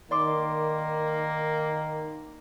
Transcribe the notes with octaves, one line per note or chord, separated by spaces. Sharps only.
D#3 A#3 D5 C6 D6